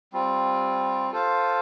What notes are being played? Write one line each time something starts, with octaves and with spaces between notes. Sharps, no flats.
G3 C4 F4
F4 A4 C5 F5